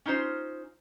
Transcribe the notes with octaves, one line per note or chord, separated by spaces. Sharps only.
C#4 D#4 F4 C5